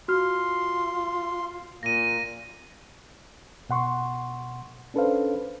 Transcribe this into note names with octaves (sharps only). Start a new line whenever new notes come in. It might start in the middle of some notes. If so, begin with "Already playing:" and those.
F4 F#4 C6 F6
A#2 A#3 A#6 D#7
B2 F#5 C6 C#6
C#4 D4 A4 B4 C5 F5